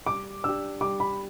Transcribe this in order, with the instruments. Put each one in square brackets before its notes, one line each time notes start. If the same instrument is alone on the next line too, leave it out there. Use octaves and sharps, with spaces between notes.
[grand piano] G3 [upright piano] D6
[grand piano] D4 G4 [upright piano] E6
[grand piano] G3 [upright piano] D6
[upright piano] B5